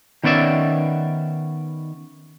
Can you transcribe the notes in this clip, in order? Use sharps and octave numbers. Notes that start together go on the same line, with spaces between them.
D#3 B3 C#4 D5 E5